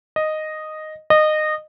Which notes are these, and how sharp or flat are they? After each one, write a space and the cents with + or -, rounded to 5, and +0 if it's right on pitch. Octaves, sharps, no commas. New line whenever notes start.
D#5 -5
D#5 -20